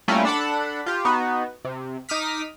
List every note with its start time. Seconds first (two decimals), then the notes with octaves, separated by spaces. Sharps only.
0.08 G3 A3 A#3 C#4 E4 F4
0.25 D4 A4 F#5 A5 B5
0.86 F4 G4
1.05 B3 D#4 F#4
1.65 C3
2.09 D#4 D6 D#6 F6 B6